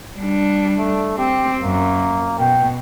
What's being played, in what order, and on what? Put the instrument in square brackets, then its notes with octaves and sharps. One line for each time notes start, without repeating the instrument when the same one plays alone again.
[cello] G3 D4
[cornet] A3
[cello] C4 [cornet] G4
[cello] F#2 [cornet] A#3
[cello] B2 [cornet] G5